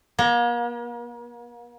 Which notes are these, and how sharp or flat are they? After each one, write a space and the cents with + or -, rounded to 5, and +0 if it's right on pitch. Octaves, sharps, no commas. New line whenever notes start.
A#3 +40 A#5 -10